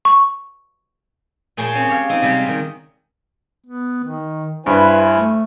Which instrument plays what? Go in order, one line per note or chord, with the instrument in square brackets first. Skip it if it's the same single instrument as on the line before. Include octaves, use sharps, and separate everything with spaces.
[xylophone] C#6
[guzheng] A#2 G#4 C#5 G5 A5 C6
C4 C#4
G4 C#5 F5
C4 D#4
C3 G3 G#3
C3 D#3
[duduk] B3
D#3
[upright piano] G2 [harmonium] E4 C5 G#5 [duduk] B4
[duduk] A3